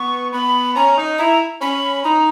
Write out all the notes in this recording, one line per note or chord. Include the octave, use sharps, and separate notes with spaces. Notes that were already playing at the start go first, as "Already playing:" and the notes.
Already playing: B3 C#6
B3 B5
C#4 A#5
D#4
E4 A#5
C#4 B5
D#4 A#5